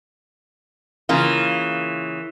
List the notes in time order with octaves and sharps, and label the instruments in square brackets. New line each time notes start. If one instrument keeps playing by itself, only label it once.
[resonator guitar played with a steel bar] C#3 A#3 F4 [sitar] E3